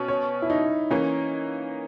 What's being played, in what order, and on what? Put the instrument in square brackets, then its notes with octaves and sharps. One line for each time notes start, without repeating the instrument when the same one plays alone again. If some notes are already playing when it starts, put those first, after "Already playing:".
Already playing: [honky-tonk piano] B2 C#4
[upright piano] C#5
E4
D#4
[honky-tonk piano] E3 A#3 D#4 [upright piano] C#4